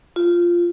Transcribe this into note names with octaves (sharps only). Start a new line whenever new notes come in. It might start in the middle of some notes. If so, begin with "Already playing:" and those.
F4